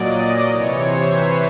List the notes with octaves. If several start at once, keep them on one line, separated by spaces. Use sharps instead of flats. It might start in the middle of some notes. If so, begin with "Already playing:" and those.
Already playing: A#2 F#3 D5 D#5
D#5
C3 E3 C#5
C5
B4